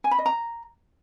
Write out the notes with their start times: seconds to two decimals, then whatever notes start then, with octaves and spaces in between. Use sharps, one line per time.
0.04 G#5
0.11 B5
0.18 D#5
0.26 A#5